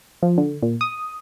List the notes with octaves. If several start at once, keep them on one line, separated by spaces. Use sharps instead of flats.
F3
D3
A#2
D#6